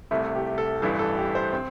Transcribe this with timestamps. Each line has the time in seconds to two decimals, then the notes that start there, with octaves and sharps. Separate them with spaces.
0.11 C2 C3 A3 E4
0.35 G4
0.58 A4
0.82 A1 G2 E3 A3 A4
0.99 A4
1.17 G4
1.35 C5
1.53 C4